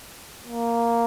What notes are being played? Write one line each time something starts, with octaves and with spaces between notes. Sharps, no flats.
A#3